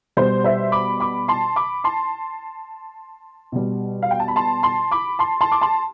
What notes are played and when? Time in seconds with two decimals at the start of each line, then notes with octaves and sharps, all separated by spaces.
0.17 B2 G3 C5
0.44 C5 E5
0.72 B5 D6
1.00 B5 D6
1.28 A5 C6
1.56 B5 D6
1.84 A5 C6
3.52 B2 G3
4.03 F5
4.11 G5
4.20 A5
4.28 B5
4.36 A5 C6
4.63 A5 C6
4.91 B5 D6
5.19 A5 C6
5.41 A5 C6
5.52 D6
5.61 A5 C6